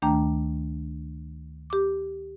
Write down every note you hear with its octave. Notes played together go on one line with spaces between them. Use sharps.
D2 D#3 A3 D4 G5 A#5
G4 D6